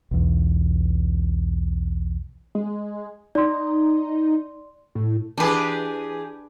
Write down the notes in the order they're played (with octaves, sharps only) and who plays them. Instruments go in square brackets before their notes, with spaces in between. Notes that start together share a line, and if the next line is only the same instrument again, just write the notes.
[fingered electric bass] B1 E2
[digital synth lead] G#3
[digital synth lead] D#4 [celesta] D5 C6
[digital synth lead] A2
[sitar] E3 G4 G#4 [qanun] D4 B4